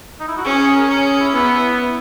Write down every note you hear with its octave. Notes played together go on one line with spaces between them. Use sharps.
D#4
E4
F#4
C#4 G#4
G#4
A#4
C#4
G#4
E4
B3 E4
E4
E4